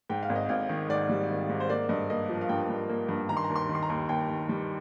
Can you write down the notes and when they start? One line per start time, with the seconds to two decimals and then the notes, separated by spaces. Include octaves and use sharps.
0.10 G#2 G5
0.23 F5
0.29 G#1
0.36 D#5
0.49 G#1 F5
0.69 D#3
0.89 G#2 D5
1.09 G3
1.30 D#3
1.49 G#2
1.60 C5
1.69 A#3 D5
1.89 G2 D#5
2.10 A#3 D#5
2.29 F3
2.41 F5
2.49 G2 G5
2.69 G2
2.89 A#3
3.09 G2
3.29 D#3 A#5
3.37 C6
3.44 D#2 A#5
3.55 C6
3.69 D#3
3.75 C6
3.83 A#5
3.89 D#2
4.09 D#2 G5
4.30 D#3
4.49 G3